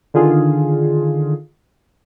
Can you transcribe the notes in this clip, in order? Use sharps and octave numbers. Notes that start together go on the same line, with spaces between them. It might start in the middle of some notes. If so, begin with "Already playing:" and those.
D3 D#3 F4 G#4